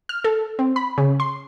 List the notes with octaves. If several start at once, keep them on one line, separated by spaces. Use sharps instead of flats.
F6
A4
C4
B5
C#3
C6